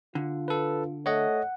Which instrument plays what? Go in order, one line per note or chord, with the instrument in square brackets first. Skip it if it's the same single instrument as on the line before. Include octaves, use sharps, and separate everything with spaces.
[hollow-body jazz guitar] D3 [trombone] F4
[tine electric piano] A4 B4
[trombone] A3 [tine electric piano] C#5 D#5 [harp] F#5